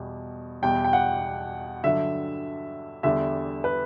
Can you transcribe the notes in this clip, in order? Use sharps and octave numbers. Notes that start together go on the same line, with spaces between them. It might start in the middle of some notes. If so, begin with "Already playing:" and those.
Already playing: E2 B2 G3
E2 B2 G3 G5
G5
F#5
G2 D3 F#3 E5
E2 D3 G3 E5
B4